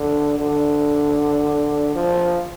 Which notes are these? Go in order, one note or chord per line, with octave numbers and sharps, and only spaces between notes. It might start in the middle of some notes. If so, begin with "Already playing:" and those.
Already playing: D3
D3
F3